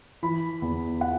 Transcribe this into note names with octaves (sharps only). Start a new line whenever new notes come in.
E3 B5
E2
F#5